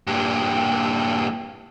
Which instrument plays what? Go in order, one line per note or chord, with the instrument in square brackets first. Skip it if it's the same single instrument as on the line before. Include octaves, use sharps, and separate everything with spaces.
[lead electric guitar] G2 A#2